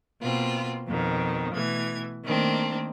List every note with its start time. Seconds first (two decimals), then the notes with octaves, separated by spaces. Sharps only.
0.22 B2 A#3 C4 F4
0.88 F2 B2 D#3
1.54 B2 E3 A3 G#6
2.25 D#3 A3 A#3 C4 D4